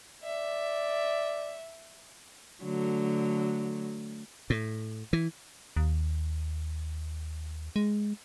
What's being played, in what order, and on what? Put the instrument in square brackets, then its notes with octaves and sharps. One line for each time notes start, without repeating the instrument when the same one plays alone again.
[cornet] D5 [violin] E5
[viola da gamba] D3 F#3 A3
[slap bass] A2
E3
[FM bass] D#2
G#3